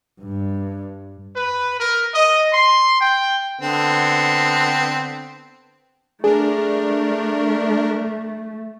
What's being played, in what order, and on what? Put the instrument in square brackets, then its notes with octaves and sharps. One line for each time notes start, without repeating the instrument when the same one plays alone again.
[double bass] G2
[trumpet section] B4
A#4
D#5
C6
G5
[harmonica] D3 B3 C4
[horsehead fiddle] A3 [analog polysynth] D4 A#4 [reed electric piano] G#4